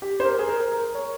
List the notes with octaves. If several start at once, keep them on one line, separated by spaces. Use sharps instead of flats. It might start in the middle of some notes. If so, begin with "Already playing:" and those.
G4
C5
A#4
G#4
A#4
A#4
C#5